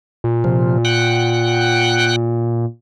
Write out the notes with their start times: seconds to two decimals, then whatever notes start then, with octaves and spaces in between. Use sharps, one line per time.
0.24 A#2
0.44 C3 F3
0.85 F#5 G5 F#6